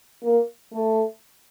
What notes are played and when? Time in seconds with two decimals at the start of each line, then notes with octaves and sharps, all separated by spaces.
0.23 A#3
0.72 A3